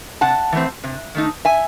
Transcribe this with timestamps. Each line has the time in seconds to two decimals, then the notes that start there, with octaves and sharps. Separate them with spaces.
0.21 C3 F#5 A5
0.52 E3 A3 C4
0.84 C3
1.15 D#3 A3 D#4
1.45 E5 G#5